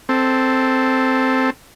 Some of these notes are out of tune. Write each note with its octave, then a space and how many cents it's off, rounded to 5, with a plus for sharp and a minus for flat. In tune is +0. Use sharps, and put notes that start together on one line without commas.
C4 +0 A4 +0